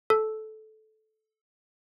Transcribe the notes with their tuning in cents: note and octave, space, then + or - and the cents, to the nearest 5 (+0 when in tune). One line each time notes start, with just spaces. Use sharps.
A4 -15